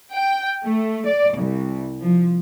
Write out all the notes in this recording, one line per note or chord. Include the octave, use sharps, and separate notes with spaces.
G5
A3
D5
C2
F3